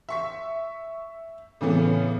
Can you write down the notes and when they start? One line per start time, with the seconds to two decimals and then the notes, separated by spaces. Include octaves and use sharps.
0.09 E5 C#6 B6
1.61 A2 C#3 E3 B3